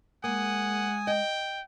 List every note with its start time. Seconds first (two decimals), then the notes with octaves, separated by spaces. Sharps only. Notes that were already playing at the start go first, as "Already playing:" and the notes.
0.24 G#3 A#3 F#5 G#5 D#6
1.07 D#5 G5